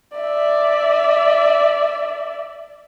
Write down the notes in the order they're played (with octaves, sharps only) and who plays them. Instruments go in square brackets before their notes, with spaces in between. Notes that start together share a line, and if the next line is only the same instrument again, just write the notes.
[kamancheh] D5 E5